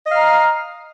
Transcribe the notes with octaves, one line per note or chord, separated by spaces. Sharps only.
D#5 F5 A#5